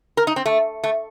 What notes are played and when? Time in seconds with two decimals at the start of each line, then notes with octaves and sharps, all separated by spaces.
0.17 A#4
0.27 D#4
0.36 C4
0.46 A3
0.84 A3